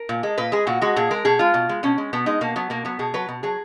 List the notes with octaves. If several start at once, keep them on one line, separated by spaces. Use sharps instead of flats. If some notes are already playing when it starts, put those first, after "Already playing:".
Already playing: A#4
A#2
G#3
A#2 B4
G#3 G#4
A#2 F#4
G#3 F#4
A#2 G#4
G#3 A#4
B2 G#4
G#3 F4
B2
G#3
B2 C#4
G#3
B2 B3
G#3 D#4
B2 A#3
F#3 B3
B2 A#3
F#3 B3
B2 G#4
F#3 B4
B2
F#3 G#4